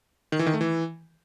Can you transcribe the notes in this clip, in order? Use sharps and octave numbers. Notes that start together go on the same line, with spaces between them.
D#3
E3
D#3
A3
E3